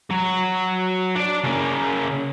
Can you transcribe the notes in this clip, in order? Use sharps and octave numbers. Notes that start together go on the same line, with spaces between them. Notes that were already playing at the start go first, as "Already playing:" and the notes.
F#3
D4 D5
C#3 A#3